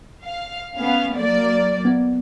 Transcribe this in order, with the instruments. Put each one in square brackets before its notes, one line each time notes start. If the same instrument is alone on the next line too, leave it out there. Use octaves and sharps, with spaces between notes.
[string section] F5
B3 C#4 F5
F#3 A#3 D5
[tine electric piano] B3